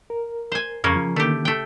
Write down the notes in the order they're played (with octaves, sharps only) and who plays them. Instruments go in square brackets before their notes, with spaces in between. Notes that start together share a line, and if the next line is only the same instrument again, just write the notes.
[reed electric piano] A#4
[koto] C5 G#5
[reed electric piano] F2 [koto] C#3 A#3 C#4
[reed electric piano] F3
[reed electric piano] D3 D#3 A#3 [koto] A3 G4
[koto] A3 G5